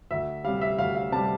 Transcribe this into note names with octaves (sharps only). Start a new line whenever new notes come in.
D2 E5
C3 G3 F5
E5
D2 F5
F5
C3 G3 A5